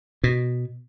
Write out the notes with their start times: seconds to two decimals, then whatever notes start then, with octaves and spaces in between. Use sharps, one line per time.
0.24 B2